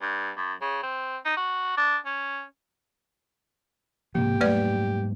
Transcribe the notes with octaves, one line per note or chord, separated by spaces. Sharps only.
G2
F#2
C#3
C4
D#4
F#4
D4
C#4
G#2 C3 F3 A#3 G4
G#2 F#3 G3 A3 B4 D5